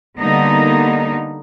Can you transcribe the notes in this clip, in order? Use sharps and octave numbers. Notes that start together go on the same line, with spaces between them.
D3 G3 A#3 B3 D#4